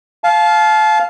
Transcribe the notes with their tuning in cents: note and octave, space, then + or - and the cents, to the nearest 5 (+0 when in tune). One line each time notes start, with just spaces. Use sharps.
F5 +0 A5 -30